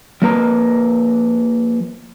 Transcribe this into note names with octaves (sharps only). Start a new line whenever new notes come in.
F3 A#3 B4 A#5